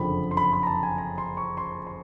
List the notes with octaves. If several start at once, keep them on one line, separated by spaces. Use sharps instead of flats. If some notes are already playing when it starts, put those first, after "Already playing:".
Already playing: F#1 F2 D3 F3 B5
C6
B5
B5
A#5
A5
G#5
A#5
C6
C#6
C6
C6